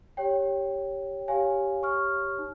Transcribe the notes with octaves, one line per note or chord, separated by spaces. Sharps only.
G4 C#5 G5
G4 C#5 F5 G#5
C#6 F6
D#4